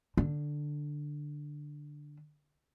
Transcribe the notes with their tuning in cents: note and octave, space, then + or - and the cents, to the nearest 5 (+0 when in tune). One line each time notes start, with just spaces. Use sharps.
D3 +5